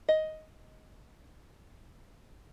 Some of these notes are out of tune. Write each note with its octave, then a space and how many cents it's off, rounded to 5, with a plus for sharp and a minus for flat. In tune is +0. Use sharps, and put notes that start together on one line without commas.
D#5 +10